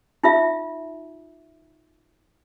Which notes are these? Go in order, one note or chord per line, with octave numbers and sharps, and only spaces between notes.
D#4 F4 E5